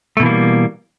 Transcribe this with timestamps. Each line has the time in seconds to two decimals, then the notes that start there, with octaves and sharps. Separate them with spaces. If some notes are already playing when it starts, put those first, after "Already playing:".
0.17 A3
0.20 B2
0.23 E3
0.26 A#3
0.29 G3